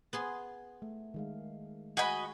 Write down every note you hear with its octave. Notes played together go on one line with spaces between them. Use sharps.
B3 G#4 C6
A3
D#3 G#3 F5
F#4 G#4 D#5 B5